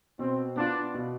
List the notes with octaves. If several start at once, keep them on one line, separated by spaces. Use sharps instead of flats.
B2 C4
B3 D4 F4
B2